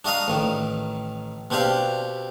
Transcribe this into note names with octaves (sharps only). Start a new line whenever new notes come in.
D4 F#4 D#5 F5 A#5
A1 D#3
B2 C4 D4 G4 F5